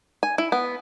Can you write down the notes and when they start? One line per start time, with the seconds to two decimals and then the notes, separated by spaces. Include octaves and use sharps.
0.23 G#5
0.38 E4
0.52 B3